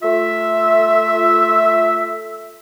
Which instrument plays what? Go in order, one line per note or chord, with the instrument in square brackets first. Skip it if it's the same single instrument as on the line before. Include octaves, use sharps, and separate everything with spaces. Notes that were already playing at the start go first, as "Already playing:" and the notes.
[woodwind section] A3 F4 E5